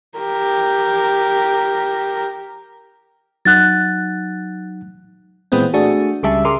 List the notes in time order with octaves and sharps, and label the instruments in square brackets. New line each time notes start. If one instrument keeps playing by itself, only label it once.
[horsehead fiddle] G4 A#4
[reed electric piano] F#3 D#4 F#5 [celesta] F#6 A6
[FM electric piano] A#2 E3 G#3 B3 C4
A3 D4 F#4 G#4
C#2 C#3 G3 E5 A5
C#3 G#4 A#4 C6 D6